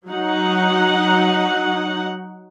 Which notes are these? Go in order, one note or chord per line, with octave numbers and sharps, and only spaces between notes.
F#3 D#4 F#5